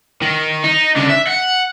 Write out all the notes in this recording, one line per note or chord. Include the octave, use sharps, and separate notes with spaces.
D#3
D#4
C#3 D4
E5
F#5